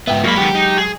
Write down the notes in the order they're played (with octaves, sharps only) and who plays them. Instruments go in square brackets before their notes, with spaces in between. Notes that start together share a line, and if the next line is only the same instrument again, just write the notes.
[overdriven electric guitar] G#2 B3 [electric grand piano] E5 G5
[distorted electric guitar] G2 B5 [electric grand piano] F#3 G#3 F#4 [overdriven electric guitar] A#3
[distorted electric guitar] D#3 B3 [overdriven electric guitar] G4
[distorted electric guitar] D#4
G#4